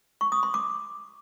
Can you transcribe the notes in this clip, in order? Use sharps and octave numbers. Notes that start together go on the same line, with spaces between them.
C#6
D#6
C6
D6